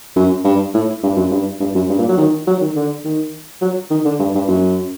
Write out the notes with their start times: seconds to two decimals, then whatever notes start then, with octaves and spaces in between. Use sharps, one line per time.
0.16 F#2
0.44 G2
0.74 A2
1.03 G2
1.17 F#2
1.31 G2
1.60 G2
1.75 F#2
1.89 G2
1.98 A#2
2.08 F#3
2.18 D#3
2.47 F#3
2.61 D#3
2.76 D3
3.05 D#3
3.61 F#3
3.90 D#3
4.05 D3
4.19 G2
4.35 G2
4.48 F#2